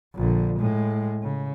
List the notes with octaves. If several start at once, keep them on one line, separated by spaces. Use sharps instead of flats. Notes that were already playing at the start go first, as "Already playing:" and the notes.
A#1 D3
A2 G#3
C#3